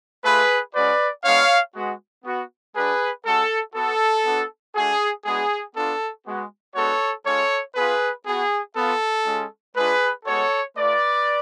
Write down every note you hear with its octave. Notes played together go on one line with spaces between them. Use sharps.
A3 F4 G#4 B4
G#3 C#4 F#4 B4 D5
G#3 B3 D4 C#5 F5
G#3 B3 F#4
B3 F#4
G#3 D4 F#4 G#4 B4
G#3 C#4 F#4 A4
B3 F#4 A4
B3 D4 F#4
A3 D4 F#4 G#4
G#3 B3 D4 F#4 G#4
B3 D4 F4 A4
G#3 B3 F#4
G#3 B3 D4 F#4 A4 C#5
G#3 C#4 F4 A4 C#5
B3 F4 G#4 B4
B3 F#4 G#4
B3 F4 A4
G#3 C#4 F4
G#3 D4 F4 G#4 B4
G#3 B3 F#4 A4 C#5
A3 F4 B4 D5